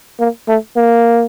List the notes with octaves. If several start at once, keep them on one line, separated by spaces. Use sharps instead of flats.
A#3
A3
A#3